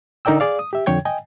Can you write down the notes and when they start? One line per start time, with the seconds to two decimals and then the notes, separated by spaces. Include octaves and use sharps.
0.25 D3 D#4 A#4 D5 G5 E6
0.40 G#4 D5 F5
0.59 D#6
0.73 G4 E5
0.86 F2 D3 C#5 G5 G#6
1.05 D#5 G5 G#5